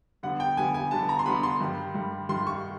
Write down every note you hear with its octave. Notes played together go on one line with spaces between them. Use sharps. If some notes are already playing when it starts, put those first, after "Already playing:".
D3 G3 B3 F#5
G5
D3 G3 B3 G#5
G#5
D3 G3 B3 A5
A#5
C6
D3 G3 B3 B5
C6
G2 D#3 G3
G2 D#3 G3
G2 D#3 G3 C6
C#6